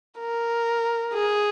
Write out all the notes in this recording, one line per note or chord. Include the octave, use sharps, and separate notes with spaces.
A#4
G#4